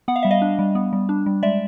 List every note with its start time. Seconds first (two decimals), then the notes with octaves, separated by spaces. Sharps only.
0.08 B3 F#5
0.16 F5
0.23 G3 E5
0.31 D#5 F5
0.42 D4
0.59 G3
0.75 B3
0.93 G3
1.09 D4
1.26 G3
1.43 G#3 D5 E5